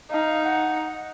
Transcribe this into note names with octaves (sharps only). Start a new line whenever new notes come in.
D#4 F5
F#5